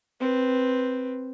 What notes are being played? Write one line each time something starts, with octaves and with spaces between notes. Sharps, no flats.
C4 B4